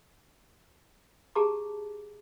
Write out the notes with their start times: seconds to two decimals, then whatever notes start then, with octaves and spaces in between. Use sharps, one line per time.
1.35 G4 G#4 A5 A#5 D6